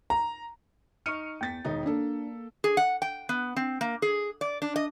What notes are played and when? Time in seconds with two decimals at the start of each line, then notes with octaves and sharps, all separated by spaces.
0.10 A#5
1.06 D#4 C#6 F6 C#7 D#7
1.41 E2 G5 A6 B6
1.65 E1 D#3 D#4
1.86 A#3 D4 A4
2.64 G#4
2.77 F#5
3.02 G5
3.29 B3
3.56 C4
3.81 A#3
4.02 G#4
4.41 D5
4.62 D4
4.76 D#5